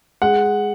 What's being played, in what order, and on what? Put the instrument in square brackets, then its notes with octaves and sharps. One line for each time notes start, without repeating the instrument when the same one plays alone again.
[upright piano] G#3 F#5